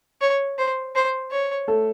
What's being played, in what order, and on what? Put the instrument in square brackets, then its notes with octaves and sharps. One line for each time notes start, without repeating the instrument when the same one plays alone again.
[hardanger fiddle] C#5
C5
C5
C#5
[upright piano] A3 A4